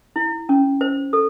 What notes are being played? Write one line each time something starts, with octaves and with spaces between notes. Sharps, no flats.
E4
C#4
C5
A4